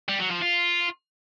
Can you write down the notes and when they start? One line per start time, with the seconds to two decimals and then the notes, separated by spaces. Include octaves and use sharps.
0.08 G3
0.20 F#3
0.31 F3
0.42 F4